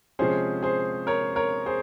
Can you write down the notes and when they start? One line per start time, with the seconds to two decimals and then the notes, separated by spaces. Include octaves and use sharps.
0.19 C3 F3 G#3 C#4 G#4 C5
0.63 G#4 C5
1.07 A#4 C#5
1.36 A#4 C#5
1.66 G#4 C5